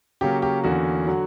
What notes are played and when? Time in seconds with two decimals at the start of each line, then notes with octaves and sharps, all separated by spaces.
0.21 C#3 F#3 A#3 C#4 G4
0.42 G4
0.64 E2 D3 A#3 C#4 F#4
1.07 D3 F#3